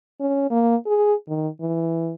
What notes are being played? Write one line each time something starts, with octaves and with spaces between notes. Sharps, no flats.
C#4
A#3
G#4
D#3
E3